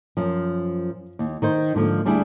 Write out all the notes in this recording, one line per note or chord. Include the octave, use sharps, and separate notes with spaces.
F#2 F3
D#2
D#3 D#4 C5
G#2 D3 F3 A#3
D2 G3 D4 E4 G#4